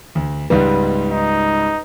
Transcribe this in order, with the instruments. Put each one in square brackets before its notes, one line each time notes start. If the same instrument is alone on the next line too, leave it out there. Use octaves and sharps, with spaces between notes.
[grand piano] D2
[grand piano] C#2 G#2 G3 [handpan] B4
[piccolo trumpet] D#4